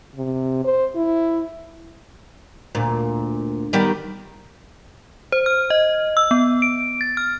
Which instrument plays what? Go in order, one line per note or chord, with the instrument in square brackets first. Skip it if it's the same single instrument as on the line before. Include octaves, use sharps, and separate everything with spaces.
[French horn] C3
C5
E4
[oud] D2 A#2
D#3 G3 B3
[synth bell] C5
F6
D#5
E6
B3
D7
A6
F6